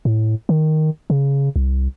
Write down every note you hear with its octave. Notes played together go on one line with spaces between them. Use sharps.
A2
D#3
C#3
C2